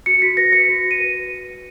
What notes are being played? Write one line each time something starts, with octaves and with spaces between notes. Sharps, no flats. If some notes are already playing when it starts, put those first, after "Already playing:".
F#4 C#7
F#4 B6
B4 A#6
B4 C#7
F#4
F#4
D#7
B4